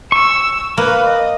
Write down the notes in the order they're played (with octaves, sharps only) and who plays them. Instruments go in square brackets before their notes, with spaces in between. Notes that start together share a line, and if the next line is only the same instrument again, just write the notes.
[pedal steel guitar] C#6 [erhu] E6
[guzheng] A#3 [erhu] B4
[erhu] D#5